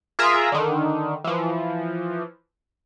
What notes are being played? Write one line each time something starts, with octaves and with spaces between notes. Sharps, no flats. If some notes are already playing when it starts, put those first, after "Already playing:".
F4 G#4 A#4 E5 A#5
D3 D#3
E3 F3